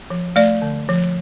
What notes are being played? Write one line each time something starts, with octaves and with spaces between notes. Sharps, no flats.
F3
A3 D5
D3
F3